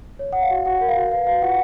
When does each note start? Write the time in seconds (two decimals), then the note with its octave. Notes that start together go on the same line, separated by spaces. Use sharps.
0.19 C#5
0.33 C#5 F#5
0.42 F5
0.50 F#4
0.66 F#4 F#5
0.81 A#4
0.89 F5
0.96 F#4
1.11 B4 F5
1.26 B4 F5
1.42 F4 F#5